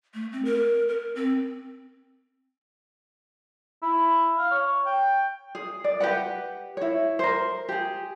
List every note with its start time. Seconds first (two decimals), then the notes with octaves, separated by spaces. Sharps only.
0.14 A3
0.32 C4
0.45 A#4
0.89 A#4
1.15 C4
3.83 E4
4.38 F5
4.51 C#5
4.86 G5
5.55 G#4
5.84 D5
6.00 G4 B4 F#5
6.77 E4 C#5
7.19 A#4 C5
7.69 G4 G#4